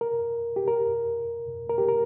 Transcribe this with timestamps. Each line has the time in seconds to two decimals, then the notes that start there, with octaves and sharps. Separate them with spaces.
0.01 A#4
0.56 G4
0.68 A#4
1.69 A#4
1.78 G4
1.89 A#4